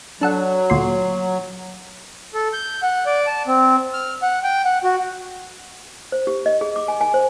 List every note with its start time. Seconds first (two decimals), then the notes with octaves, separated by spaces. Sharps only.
0.21 F#3 D4 A4 F#5
0.70 D2 A#2 C6
2.34 A4
2.53 G6
2.82 F#5
3.06 D5
3.27 A5
3.47 C4
3.93 F6
4.22 F#5
4.44 G5
4.65 F#5
4.84 F#4
6.12 C5
6.27 G4
6.46 D#5
6.61 G#4
6.76 D6
6.88 G#5
7.01 G#5
7.14 C5